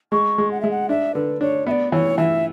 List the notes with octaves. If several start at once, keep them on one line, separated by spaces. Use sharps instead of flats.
G#3 C#6
G#3
F#5
G#3 E5
F#5
D4 E5
D3 B4
D4 C#5
B3 D5 E5
E3 C#5
E3 E5